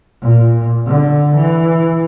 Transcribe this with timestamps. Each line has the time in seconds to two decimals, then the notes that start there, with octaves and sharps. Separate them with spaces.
0.22 A#2
0.87 D3
1.36 E3